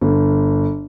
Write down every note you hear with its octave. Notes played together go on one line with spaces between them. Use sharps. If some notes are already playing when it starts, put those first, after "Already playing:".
G1